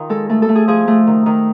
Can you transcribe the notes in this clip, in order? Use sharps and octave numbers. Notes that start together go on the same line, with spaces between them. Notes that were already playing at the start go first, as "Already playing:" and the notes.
Already playing: D#3 F4
G#3 A4
A3 A4
A4
A3
G#4
F3 G#4
A3
D#3
D#3